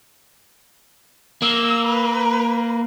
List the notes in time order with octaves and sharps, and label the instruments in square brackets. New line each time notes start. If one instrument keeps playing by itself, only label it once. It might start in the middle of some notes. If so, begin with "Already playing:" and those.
[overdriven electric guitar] A#3 [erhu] E6
[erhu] B4